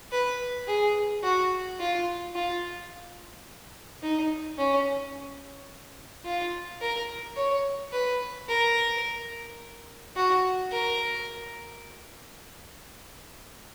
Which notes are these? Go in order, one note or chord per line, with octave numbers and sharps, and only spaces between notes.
B4
G#4
F#4
F4
F4
D#4
C#4
F4
A#4
C#5
B4
A#4
F#4
A#4